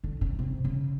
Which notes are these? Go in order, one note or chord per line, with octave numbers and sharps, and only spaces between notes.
D3
C#3
C3
C#3